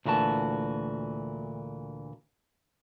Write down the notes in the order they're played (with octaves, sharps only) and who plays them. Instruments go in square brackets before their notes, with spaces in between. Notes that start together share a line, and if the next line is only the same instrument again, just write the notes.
[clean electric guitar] D2 A#2 E3 F#4 A5